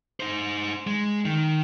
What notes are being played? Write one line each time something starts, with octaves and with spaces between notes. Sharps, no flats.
D#4 C5
G#3
D#3